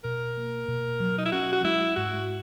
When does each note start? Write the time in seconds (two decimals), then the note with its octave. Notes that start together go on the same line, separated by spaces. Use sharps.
0.04 B2 A#4
0.37 A#3
0.68 B2
1.00 F#3
1.18 D#4
1.25 E4
1.32 C#4 F#4
1.53 F#4
1.64 G#3 E4
1.96 G#2 F#4